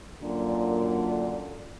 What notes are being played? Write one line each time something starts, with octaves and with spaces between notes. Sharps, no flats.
F#2 A#2 D3